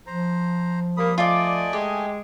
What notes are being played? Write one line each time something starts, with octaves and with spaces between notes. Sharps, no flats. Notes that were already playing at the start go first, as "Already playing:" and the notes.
F3 C5 A#5
G3 A#3 B5 D#6
A3 F4 D5 D#5 G#5 D6
G#3 G4